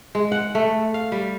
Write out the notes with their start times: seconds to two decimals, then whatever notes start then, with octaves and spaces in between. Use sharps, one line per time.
0.15 G#3
0.32 F#5
0.55 A3
0.94 F5
1.12 G3